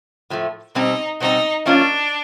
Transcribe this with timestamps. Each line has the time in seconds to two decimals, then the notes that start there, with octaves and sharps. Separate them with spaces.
0.30 A2 F3 A3
0.75 B2 G3 C4 D#4
1.20 B2 G3 C4 D#4
1.65 F3 A#3 C#4 D4 F4